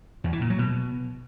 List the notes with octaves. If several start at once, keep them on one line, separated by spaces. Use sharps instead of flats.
E2
E3
A#2
F#3
B2